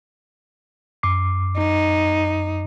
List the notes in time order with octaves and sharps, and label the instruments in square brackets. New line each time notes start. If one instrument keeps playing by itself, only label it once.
[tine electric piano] F#2 D6 C7
[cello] D#4